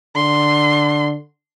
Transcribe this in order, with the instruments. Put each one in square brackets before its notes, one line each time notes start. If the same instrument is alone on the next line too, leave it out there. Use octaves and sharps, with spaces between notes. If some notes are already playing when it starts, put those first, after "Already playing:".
[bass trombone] D3 [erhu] C6